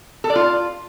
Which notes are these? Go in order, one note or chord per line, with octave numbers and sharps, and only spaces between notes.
A4
D5
F4